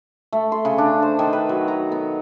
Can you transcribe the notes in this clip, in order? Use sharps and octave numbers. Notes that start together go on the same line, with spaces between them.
A3
C6
C#3
D4
C5
D#3
B4
F#3
A#5
B3